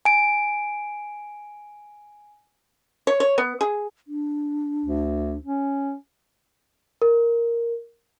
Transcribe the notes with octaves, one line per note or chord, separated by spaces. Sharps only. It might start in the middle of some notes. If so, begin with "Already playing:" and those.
G#5 D7
C#5
C#5
B3
G#4
D4
D2
C#4
A#4